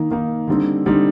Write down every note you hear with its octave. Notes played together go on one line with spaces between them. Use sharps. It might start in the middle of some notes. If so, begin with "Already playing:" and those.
Already playing: D#3 A#3 D#4
D#3 A#3 D#4
D3 G3 C4 D#4
D3 G3 C4 D#4